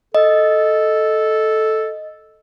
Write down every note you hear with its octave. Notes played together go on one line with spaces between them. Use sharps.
A4 D#5